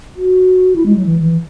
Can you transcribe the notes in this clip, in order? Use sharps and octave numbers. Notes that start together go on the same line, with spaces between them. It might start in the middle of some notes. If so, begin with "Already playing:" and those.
F#4
E4
G#3
F#3
E3
E3